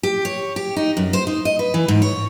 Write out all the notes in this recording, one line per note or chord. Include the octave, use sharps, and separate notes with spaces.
G4
C#5
G4
D#4
F#2
C5
D#4
D#5
B4
E3
G#2
C#5